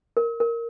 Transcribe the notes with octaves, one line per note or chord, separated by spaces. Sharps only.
A#4
A#4